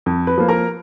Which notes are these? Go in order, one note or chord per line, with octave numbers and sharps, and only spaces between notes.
F2
B4
F3 A#3
A#4 A#5